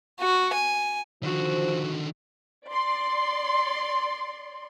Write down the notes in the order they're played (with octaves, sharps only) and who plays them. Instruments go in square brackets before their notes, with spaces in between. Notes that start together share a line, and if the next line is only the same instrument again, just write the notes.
[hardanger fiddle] F#4
G#5
[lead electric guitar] D3 D#3 [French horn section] F3 C5 [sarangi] F#4
[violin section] D5 C6